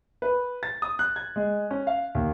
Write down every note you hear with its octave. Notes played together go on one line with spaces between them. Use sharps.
B4
A6
D#6
F#6
G#6
G#3
C#4
F5
D#2